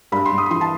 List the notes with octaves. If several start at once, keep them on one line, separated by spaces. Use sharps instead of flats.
G2 B5
C6
G2
D#6
B5
E3 C6
A5